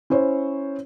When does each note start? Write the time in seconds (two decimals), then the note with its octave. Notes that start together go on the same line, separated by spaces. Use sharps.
0.10 C#4 E4 C5 C#5